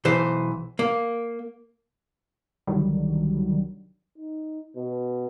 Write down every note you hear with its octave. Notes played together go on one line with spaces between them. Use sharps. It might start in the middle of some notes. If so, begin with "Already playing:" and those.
B1 E3 C5
A#3
C2 D3 D#3 F#3 G3
D#4
B2